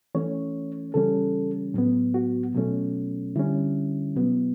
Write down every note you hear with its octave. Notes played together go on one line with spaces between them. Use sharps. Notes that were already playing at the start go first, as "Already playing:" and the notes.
E3 A3 C#4 C#5
C#3 E3 G3 C#4 A4
A2 F#3 B3
F#4
B2 F#3 A3 C#4
D3 G3 C#4 E4
B2 F#3 B3